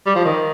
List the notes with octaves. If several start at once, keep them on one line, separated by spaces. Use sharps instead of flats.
G3
F3
D#3